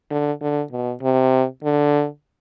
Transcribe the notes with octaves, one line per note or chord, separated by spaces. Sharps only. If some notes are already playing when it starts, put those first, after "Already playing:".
D3
D3
B2
C3
D3